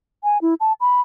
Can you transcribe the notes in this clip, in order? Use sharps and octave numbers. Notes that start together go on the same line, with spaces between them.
G#5
E4
A5
B5